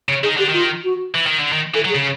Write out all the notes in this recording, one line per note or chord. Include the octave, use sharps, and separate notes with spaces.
C#3
D#3 G#4
D3 G4
D#3 F4
F#4
E3
D#3
D3
D#3
E3 A4
F#3
G#4
C#3